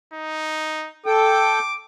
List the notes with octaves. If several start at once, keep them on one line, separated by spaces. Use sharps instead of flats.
D#4
A4 G5 D6